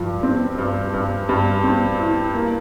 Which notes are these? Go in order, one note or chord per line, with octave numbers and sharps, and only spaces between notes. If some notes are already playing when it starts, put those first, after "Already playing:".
Already playing: G2 F3
C4
G2
G2
G2
C4
E4
A#3